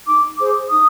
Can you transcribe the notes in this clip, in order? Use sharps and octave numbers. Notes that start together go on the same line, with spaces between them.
D#4 D6
G#4 C5 D6
D#4 D#6